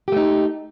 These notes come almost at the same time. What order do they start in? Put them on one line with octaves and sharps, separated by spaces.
G4 A3 D#4